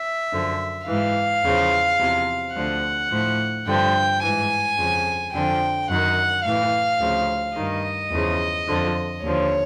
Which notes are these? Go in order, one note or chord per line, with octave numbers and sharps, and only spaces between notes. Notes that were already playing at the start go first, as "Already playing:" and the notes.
Already playing: E5
F#2 D3 F3
G#2 E3 F5
E2 C#3 F3
E2 C3 F3
D2 D3 F3 F#5
A2 F3
G2 D3 F3 G5
G#2 E3 G#5
F2 C#3 F3
F2 D3 F3 G5
F#2 D#3 F#5
A2 E3 F5
D2 C#3 F3
G2 D#3 D#5
E2 C#3 F3
F2 D3 F3
D#2 D3 F3 C#5